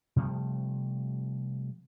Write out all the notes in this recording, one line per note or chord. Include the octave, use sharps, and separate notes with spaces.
C3 F3 G3 A3